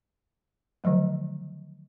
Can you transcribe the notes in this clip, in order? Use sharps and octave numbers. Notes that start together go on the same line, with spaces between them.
D3 D#3 F3 F#3 A3